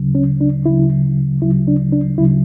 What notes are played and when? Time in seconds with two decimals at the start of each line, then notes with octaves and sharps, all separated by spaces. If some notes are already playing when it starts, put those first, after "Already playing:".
Already playing: D2 C#3 F#3
0.15 C#4
0.41 D4
0.66 D2 C#3 F#3 E4
1.41 D2 C#3 F#3 E4
1.68 D4
1.92 D4
2.18 D2 C#3 F#3 E4